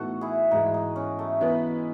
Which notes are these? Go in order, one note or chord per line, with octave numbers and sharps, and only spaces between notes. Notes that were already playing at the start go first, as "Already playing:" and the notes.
Already playing: A2 E3 B3 D#4 F#4 A4
E4 G#4
G#2 E3 G#3 D#4
D#4
C#4
A3
E3 G#3 B3 E4 B4